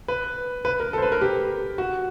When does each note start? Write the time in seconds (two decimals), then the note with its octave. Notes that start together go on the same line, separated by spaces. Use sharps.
0.08 B4
0.65 B4
0.80 A#4
0.93 A4
0.98 C5
1.02 B4
1.12 A#4
1.21 G4
1.78 F#4